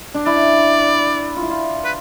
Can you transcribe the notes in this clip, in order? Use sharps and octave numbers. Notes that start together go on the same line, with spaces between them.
D4
E4 D5
F4
E4
F4
B4